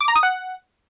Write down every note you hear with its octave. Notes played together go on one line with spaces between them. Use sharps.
D6
A#5
D#6
F#5